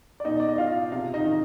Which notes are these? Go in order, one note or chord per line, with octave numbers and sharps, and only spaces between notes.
D5
B2 D#4 D#5
D5
D#5
F4 F5
C3 F4 F5
D#4 D#5
D#3